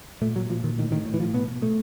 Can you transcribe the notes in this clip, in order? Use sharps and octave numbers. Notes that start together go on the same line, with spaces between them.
A#2 A3
A#2 F#3
A#2 F3
A#2 D#3
A2 D#3
A2 D#3
A2
E3
A2 F3
B2 B3
B2
B2 A3